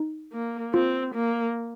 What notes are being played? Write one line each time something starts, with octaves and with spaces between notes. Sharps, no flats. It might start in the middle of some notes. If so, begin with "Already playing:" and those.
Already playing: D#4
A#3
C4 F4
A#3